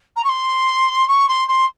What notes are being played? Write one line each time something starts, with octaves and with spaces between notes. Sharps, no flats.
A#5
C#6
C6
C#6
C6
C6